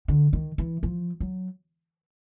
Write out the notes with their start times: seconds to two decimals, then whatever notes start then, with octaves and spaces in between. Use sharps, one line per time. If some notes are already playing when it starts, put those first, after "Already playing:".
0.08 D3
0.33 D#3
0.58 E3
0.83 F3
1.20 F#3